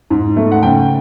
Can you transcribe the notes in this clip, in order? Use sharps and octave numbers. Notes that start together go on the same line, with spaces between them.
G#2
A3
F#5
C#3 G5